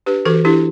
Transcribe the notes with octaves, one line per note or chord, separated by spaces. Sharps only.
D4 G4 B4
E3 F#4 A4
D4 E4 G4